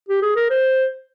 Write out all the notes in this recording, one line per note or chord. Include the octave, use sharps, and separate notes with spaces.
G4
G#4
A#4
C5